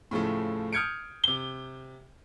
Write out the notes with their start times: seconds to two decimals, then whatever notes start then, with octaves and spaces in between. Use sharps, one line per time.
0.11 A2 C#3 F3 A3
0.73 D#6 F6 G6 G#6 C#7 D7
1.24 C3 G7